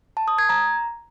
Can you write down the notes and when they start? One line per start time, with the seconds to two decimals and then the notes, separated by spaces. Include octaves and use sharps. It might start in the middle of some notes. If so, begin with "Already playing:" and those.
0.17 A5
0.28 D#6
0.38 G#6
0.49 A#5